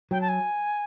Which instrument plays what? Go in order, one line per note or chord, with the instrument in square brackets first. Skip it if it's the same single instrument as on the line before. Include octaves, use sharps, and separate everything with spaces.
[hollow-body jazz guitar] F#3 [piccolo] G5
[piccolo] A5
G#5